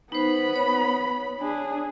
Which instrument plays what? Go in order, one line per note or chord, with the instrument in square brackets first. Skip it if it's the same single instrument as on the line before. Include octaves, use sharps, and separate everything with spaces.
[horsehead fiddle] B3 B5 [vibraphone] D#4 C5
[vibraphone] C#5
[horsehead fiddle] D4 G#4